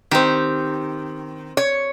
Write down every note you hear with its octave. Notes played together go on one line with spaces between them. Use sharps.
D#3 C4 G4
C#5